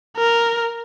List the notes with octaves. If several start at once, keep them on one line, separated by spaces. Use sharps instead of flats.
A#4